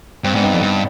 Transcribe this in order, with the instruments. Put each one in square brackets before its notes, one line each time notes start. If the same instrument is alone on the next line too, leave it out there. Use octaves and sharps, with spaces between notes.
[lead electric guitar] G2 [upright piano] C4
[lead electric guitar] G#2 [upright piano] B3 D4
[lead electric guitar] G2 [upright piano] C4 D#4
[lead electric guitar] F2 [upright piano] B3 D4
[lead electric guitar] G2